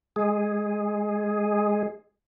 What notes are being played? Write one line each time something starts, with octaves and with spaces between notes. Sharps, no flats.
G#3 G#4